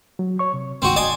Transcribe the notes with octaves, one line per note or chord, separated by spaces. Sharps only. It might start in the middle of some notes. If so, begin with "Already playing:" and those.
F#3
C#5 C#6
C3
C#2 G#2 D#3 C4 F#4
D5 D#5 G#5 C6